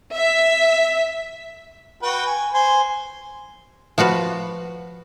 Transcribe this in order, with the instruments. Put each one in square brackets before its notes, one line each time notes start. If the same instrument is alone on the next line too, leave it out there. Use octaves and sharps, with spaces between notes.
[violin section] E5
[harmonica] F#4 B4 G5
G#5
C5 G#5
[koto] F3 F4 F#4 B4